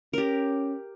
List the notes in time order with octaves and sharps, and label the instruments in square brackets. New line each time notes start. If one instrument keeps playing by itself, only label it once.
[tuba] C#4 [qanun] G4 A#4